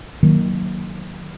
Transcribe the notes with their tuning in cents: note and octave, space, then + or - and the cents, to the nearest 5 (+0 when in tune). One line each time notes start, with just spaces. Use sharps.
D#3 +0 F#3 +0 A#3 +0